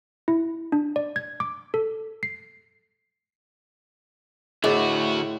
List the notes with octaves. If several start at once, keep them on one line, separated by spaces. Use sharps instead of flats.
E4
D4
D5
G#6
D6
A4
C7
D2 A2 F#4 G#4 A#4 D#5